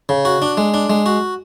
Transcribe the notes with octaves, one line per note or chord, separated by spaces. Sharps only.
C#3
F#4
D4
G#3
D4
G#3
F#4